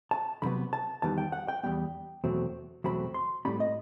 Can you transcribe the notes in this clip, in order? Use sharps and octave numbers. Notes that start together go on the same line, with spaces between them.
A5
E2 C3 F#3 B3 B5
A5
E2 D#3 G3 B3 A5
G5
F#5
G5
E2 D#3 G3 B3 G5
E2 B2 F#3 A3 C4
E2 B2 F#3 A3 C4 B5
C6
A2 G3 C4 B5
D#5